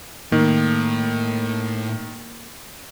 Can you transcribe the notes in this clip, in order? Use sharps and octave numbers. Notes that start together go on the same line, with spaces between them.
A2 D#3 A#3